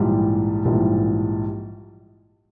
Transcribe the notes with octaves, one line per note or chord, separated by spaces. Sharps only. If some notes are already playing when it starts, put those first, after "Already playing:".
Already playing: A#1 G#2 E3 G3
A#1 G#2 E3 G3